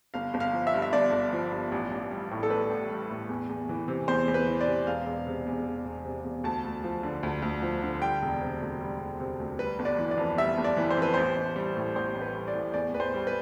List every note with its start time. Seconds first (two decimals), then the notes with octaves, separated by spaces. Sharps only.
0.14 G1 F5
0.34 G1
0.40 F5
0.53 F3
0.67 E5
0.74 G2
0.82 E5
0.93 G1 D5
1.12 G1
1.33 F3
1.52 G2
1.72 A1
1.92 A1
2.11 G3
2.31 A2
2.43 A4
2.50 A1 B4
2.70 A1
2.89 G3
3.10 A2
3.29 E2
3.49 E2
3.69 E3
3.88 C3
4.08 E2 C5
4.28 E2
4.34 B4
4.47 E3
4.61 D5
4.67 C3
4.87 E1 F5
5.06 E1
5.27 C3
5.46 E2
5.65 E1
5.85 E1
6.05 C3
6.25 E2
6.44 D2 A5
6.64 D2
6.84 F3
7.03 D3
7.23 D2
7.42 D2
7.62 F3
7.82 D3
8.01 G3 G5
8.22 E1
8.41 C3
8.60 D2
8.81 G3
9.00 E1
9.20 C3
9.40 D2
9.59 G3 B4
9.79 G1
9.85 D5
9.99 E3
10.11 D5
10.18 F2
10.38 G3 E5
10.58 G1
10.64 D5
10.77 E3
10.90 C5
10.97 F2
11.02 B4
11.14 A1 C5
11.36 A1
11.56 G3
11.76 A2
11.95 A1 C5
12.15 A1
12.22 B4
12.35 G3
12.48 D5
12.55 A2
12.74 E2 D5
12.94 E2 B4
13.00 C5
13.14 G3
13.27 B4